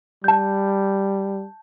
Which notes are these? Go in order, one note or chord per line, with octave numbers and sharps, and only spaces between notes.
G3 A5 G6